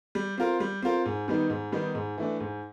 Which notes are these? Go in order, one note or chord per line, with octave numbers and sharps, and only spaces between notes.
G3
C4 F4 A#4
G3
C4 F4 A#4
G#2
D#3 G3 B3 D#4
G#2
D#3 G3 B3 D#4
G#2
E3 A3 D4
G#2